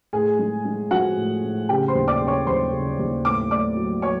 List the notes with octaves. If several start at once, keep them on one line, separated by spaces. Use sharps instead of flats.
A2 G#4 G#5
G#3
G#3
F3 F#4 F#5
A2
A2
C#3 G4 G5
C5 C6
D#2
D5 D6
C#3
C#5 C#6
D#2 C5 C6
C#3
D#2
A2 D6
A2 D5 D6
F#3
F#3 C#5 C#6